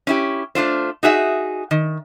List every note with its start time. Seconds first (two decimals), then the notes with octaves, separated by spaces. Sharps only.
0.07 C#4 E4 G4
0.55 A3 D4 F4 C5
1.03 D#4 F#4 G#4 E5
1.71 D#3